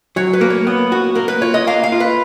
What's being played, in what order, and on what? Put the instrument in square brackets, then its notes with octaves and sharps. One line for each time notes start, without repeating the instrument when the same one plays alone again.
[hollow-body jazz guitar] F#3 [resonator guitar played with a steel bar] C#5
[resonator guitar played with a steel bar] B4
[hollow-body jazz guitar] A#3
[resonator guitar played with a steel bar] C#5
[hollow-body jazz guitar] B3
F#4
[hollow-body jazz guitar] A#3 [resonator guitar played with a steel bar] A#4
[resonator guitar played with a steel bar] B4
[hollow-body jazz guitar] F4 [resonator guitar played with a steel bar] C#5
[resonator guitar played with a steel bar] D#5
[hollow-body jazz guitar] A#3 [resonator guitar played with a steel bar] F5
[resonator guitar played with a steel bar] F5
[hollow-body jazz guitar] F4
[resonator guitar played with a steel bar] B4